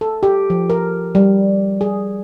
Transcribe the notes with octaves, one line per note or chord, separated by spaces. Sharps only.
A4
G4
F3
A#4
G3
G#4